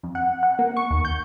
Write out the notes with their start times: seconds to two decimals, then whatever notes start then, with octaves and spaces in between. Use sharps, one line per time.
0.03 F2
0.15 F#5
0.43 F#5
0.59 A#3
0.77 C#6
0.90 D#2
1.05 G6